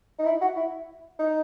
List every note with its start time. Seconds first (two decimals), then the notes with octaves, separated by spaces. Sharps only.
0.19 D#4
0.25 E4
0.41 F#4
0.56 E4
1.19 D#4